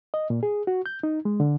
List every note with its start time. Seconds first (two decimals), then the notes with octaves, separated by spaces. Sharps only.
0.14 D#5
0.30 A#2
0.43 G#4
0.67 F#4
0.86 G6
1.03 D#4
1.25 G#3
1.40 D3